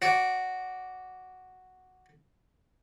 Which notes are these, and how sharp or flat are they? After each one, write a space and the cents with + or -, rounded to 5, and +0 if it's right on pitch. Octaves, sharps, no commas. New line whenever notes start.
F#4 +0 D5 -15